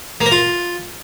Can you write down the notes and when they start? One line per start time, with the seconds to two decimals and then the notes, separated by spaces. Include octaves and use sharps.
0.21 A#3
0.26 A#4
0.32 F4